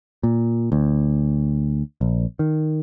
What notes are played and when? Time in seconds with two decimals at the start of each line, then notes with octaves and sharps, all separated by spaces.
0.23 A#2
0.72 D2
2.01 A#1
2.39 D#3